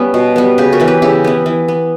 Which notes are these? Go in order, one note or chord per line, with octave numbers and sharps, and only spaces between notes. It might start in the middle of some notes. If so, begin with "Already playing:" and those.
Already playing: G3 B3 C#4
B2
G3 B3
C#3 G4 B4
F#4 A#4
E3 B3
G4 B4
C#3 E4 G4
E3 B3
E3
B3